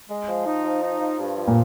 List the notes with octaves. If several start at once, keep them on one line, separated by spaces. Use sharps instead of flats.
G#3
F3
D#4
F3
D#4
F3
G2
F3
A#2